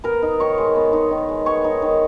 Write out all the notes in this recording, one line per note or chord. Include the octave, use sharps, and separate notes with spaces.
B3 A#4 A#5
D#4
D#3 C#5 C#6
G#3
B3
D#4
D#3
G#3
B3 C#5 C#6
D#4
D#3